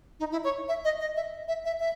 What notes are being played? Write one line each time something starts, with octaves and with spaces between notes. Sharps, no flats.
D#4
E4
C#5
E5
D#5
D#5
E5
E5
E5
E5